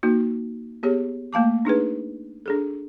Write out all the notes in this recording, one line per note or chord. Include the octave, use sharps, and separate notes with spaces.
A#3 D#4 F#4
B3 G4 G#4 C#5
A3 A#3 F5 A5 D6
D4 D#4 G#4 B4
D4 G#4 A4